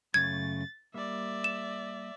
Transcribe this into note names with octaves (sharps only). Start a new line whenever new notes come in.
F#2 C#3 A3 G#6 A6
G3 A#3 D5 E5
E7